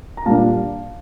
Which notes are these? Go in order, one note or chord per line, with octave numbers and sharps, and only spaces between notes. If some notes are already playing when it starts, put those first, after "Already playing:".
A#5
A#2 G3 A#3 D4 F5 A5